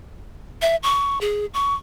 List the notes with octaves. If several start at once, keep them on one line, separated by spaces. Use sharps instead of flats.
E5
C#6
G#4
C#6